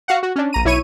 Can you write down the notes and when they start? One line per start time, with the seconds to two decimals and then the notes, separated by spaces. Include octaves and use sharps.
0.08 F#4 F5 F#5
0.23 F#4
0.36 C#4 D4
0.53 A#1 A#5 D#7
0.65 B1 E4 C#5 C#6 D#7